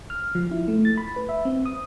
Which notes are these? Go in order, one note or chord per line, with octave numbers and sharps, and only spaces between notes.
F6
F3
E4
A3
A6
B5
B4
E5
C4
D#6